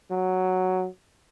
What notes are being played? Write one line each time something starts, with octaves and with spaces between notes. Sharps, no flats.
F#3